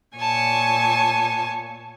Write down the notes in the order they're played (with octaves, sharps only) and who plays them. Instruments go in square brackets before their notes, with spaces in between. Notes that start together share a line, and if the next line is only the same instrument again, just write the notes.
[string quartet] A#2 C#5 G#5 A5 C#6